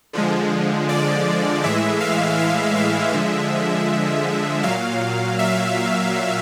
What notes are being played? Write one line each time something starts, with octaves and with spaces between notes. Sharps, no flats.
D3 F3 G#3
D5
A2 E3 G#3 E5
F5
F5
E5
D3 F3 G#3
A#2 F#3 F5
E5